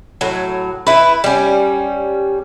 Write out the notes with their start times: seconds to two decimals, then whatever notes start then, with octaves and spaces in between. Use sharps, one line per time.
0.21 A2 F#3
0.87 E4 B4
1.24 G3 C#4